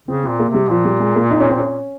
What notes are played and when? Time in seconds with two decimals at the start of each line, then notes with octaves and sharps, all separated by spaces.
0.08 C#3 C4
0.24 C4
0.29 A#2
0.39 A#3
0.49 C3
0.54 G3
0.70 A#2 F3
0.85 G3
1.00 G#3
1.16 A#3
1.31 D#4
1.40 C#4
1.49 C4
1.59 C#4